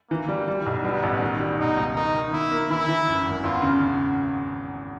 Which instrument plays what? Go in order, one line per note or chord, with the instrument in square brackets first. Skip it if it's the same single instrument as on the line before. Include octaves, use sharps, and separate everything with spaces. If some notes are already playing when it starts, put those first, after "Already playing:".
[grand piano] E3 [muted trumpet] A#3
[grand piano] G3
G3
B1
[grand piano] G3 [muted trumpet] B3
[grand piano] A1
D#3
G3
[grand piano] B2 [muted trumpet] D#4
[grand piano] C#2
[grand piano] D#3 [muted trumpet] D#4
[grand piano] D#3
[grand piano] A#3 [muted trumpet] E4
[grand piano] A#3
[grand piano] E3 [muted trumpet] E4
[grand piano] E3
F#2
G#1
[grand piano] E2 [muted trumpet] F4
[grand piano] C#3